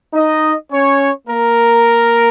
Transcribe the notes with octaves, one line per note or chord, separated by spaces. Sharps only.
D#4 D#5
C#4 C#5
A#3 A#4